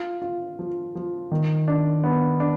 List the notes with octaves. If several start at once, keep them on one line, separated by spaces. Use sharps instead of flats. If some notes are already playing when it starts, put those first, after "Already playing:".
Already playing: F4
F4
F3
F3
D#3
D4
B3
D4